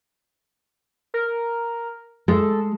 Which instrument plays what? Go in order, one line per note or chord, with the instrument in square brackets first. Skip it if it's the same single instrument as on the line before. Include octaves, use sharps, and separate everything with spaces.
[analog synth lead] A#4
[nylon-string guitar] G#3 [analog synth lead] A4